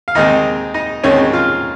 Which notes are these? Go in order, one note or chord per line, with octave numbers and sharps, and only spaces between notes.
F5
D#2 D#3 G#3 C4 D#4 D#5
D#4 D#5
D#2 D#3 G#3 C4 C#4 C#5
F4 F5